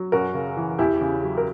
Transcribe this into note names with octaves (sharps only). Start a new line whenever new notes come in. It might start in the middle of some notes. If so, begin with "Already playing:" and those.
Already playing: F#3
F#2 F#4 A#4
C#3
E3
E2 E4 G4
C#3
F#3
A#4